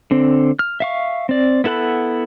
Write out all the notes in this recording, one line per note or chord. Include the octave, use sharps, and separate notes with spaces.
D3 C4
F6
E5 F5 C#6
C4 D5
B3 E4 A4 F#5 B5